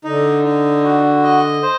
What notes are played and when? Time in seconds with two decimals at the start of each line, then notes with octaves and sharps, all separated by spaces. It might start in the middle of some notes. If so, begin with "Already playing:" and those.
0.04 D3 D#4
0.44 D#4
0.84 F#4
1.24 D#5
1.63 C5